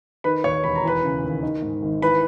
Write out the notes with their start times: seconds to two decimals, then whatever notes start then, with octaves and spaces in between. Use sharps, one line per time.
0.24 D#3 B4 B5
0.44 D#2 C#5 C#6
0.64 E1 B5
0.76 A#5
0.84 E3 B4 B5
1.03 C#3
1.23 D#2
1.43 D#3
1.62 G#2
1.83 G#1
2.02 E3 B4 B5